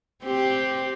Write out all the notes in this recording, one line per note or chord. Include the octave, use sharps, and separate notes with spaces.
C4 G4